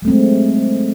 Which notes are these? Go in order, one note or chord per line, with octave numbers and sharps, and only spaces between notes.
F#3 G#3 A3 C4